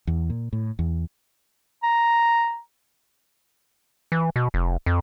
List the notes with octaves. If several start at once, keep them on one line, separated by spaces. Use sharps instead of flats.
E2
A#2
A2
E2
A#5
E3
B2
F1
F2